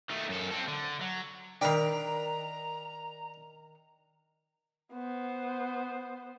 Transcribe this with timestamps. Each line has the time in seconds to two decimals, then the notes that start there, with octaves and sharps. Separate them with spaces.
0.10 D#3 A3
0.29 F#2 A4
0.51 C4 A4
0.68 D3
1.01 F#3
1.61 D#3 D4 A#4 B4 G5 A#5
4.94 B3 C5